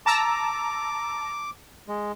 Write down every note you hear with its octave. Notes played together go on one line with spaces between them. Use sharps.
A5 A#5 D6 E6
G#3